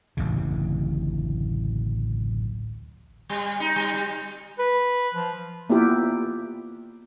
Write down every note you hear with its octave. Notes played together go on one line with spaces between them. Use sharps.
D1 A1 F#2 C#3
G3
D#4
G3
G3
B4
F3
A#3 B3 E4 F4 G4